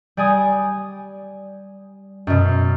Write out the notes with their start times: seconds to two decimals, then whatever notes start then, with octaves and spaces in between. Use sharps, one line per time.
0.17 G3 D5 G#5 D#6
2.27 F#2 B2